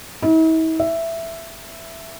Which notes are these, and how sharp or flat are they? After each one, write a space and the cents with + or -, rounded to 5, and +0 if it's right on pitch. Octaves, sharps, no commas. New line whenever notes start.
E4 -45
E5 +5